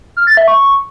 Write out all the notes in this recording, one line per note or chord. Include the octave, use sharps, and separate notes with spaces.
F6
A6
E5
C#6